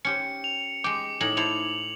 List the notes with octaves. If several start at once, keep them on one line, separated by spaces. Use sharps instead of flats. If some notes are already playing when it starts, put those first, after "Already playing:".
C#4 G4 C5 C#7
F7
G#3 G5 D6
A2 D#4 G#4 F#7
E4 A4 C5 F7